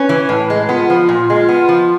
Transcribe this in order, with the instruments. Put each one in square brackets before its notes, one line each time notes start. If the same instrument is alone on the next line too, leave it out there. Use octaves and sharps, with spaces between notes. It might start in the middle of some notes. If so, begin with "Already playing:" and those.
Already playing: [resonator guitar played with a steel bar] C#4 [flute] B4
[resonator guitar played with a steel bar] E3
A2
G#3
[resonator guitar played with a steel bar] B3 [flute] F4
[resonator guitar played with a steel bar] F3
A#2
G#3
B3
F3